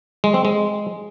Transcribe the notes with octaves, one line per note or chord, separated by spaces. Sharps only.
G#3
C4
G#3